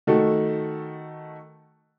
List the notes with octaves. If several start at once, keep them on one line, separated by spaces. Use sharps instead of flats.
D#3 A3 F#4 A4